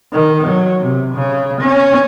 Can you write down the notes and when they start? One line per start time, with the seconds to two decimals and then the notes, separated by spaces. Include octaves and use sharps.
0.13 D#3
0.47 F#3
0.81 C3
1.14 C#3
1.61 C#4